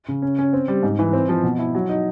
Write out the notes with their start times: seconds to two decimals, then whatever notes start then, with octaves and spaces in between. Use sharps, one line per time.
0.08 C#3
0.22 C#4
0.39 C#4
0.53 C4
0.68 G3
0.83 G#2
0.99 E3
1.13 C4
1.29 F3
1.44 B2
1.59 E4
1.75 F#3
1.89 D#4